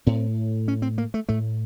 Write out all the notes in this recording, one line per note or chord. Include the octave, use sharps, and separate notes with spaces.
A2 C4
C#4
C4
A#3
A3
A2 A3